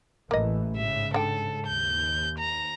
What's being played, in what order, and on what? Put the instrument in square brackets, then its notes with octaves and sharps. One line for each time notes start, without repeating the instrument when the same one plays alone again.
[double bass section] A1 E3 A3 [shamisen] A#3 D#5
[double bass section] G#2 C#3 [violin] E5
[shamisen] D3 G5 [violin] A4
[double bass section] D#2 [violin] G6
[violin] A#5